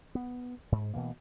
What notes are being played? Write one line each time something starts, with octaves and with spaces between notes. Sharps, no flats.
B3
G#2
B2 E3 A#3